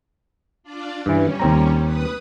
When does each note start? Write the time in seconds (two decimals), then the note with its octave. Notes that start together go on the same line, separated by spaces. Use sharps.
0.63 D4 F4 D5
1.06 G2 E3 G3 C#4
1.40 D#2 C4 A#5
1.82 B4 D#6